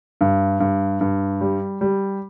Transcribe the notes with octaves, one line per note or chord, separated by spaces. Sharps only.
G2
G2
G2
G3
G3